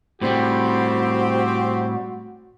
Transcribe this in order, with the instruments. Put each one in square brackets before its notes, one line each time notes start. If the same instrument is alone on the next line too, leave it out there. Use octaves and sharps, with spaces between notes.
[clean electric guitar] A2 G3 [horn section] C4 G4 [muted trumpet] F#4